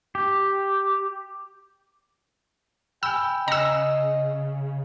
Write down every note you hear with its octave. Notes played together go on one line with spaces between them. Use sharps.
G4
G5 G#5 B5 E6
C#3 D#5 G#5 A#5 E6 C#7